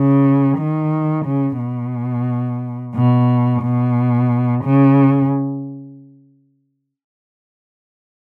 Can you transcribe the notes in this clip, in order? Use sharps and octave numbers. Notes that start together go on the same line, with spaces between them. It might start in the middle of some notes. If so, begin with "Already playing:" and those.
Already playing: C#3
D#3
C#3
B2
B2
B2
C#3